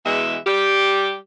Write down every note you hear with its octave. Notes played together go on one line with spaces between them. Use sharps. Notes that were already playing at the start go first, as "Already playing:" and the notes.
E2 B2 E3 G#3 E5
G3 G4